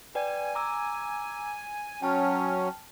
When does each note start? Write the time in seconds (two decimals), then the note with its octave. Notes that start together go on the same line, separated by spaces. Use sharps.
0.15 B4 D5 G5 G#5
0.55 A#5 D6 E6
2.02 F#3 C#4 G5 A5 F6